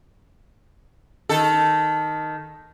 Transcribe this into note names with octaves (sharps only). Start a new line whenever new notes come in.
D#3 A4